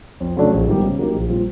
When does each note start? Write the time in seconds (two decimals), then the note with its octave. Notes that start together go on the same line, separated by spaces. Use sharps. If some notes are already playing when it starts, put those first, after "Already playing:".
0.20 F2
0.36 C#3 F#3 A3 D4
0.52 A#1
0.67 G#2 D#3 G3 B3
0.84 C#3
0.99 F#3 A#3 D#4 G4
1.14 A#1
1.30 A#2 G3 C4 F4